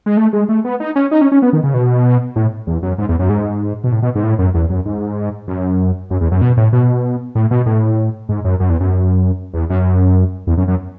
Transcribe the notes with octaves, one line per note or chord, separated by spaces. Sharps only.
G#3
A3
G#3
A3
B3
D#4
C#4
D#4
C#4
C#4
B3
D#3
C#3
B2
A2
E2
F#2
G#2
E2
F#2
G#2
B2
A2
B2
G#2
A2
F#2
E2
F#2
G#2
F#2
F#2
E2
F#2
B2
A2
B2
A2
B2
A2
G#2
F#2
F#2
E2
F#2
E2
F#2
E2
F#2
F#2